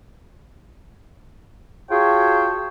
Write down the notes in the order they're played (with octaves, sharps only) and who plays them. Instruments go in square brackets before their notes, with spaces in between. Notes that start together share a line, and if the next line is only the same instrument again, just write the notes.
[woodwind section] F4 F#4 G#4 C#5 G5 A5